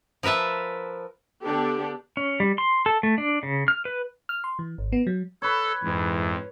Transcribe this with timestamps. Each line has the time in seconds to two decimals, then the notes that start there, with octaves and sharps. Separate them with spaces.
0.23 F3 A#4 B4 E5 A5
1.42 D3 B3 D4 G4 A4
2.17 C#4
2.40 G3
2.58 C6
2.86 A4
3.03 A3
3.18 D4
3.43 C#3
3.68 F6
3.85 B4
4.29 F6
4.44 C6
4.59 E3
4.78 G#1
4.92 B3
5.07 F#3
5.42 A4 B4 C#5
5.83 F2 G#2 E3